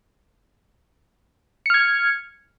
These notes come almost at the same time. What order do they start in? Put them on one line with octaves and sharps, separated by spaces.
C#7 F6 G#6